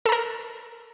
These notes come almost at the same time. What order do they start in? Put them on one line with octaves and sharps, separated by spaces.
A4 A#5 A#4